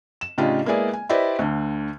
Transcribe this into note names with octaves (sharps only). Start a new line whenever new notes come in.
E7
A2 C#3 D4 D#4 F4 G4
G#3 A#3 B3 E4 G#4 D5
G#5
E4 G4 B4 C5 D5 D#5
D2 D3